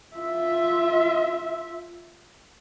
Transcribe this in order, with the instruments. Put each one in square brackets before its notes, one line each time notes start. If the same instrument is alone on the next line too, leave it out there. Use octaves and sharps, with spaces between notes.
[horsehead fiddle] F4 E5